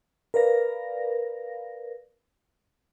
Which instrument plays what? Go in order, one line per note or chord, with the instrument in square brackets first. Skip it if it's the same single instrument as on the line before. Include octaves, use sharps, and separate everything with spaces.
[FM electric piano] A#4 B4 D5 F5 A#6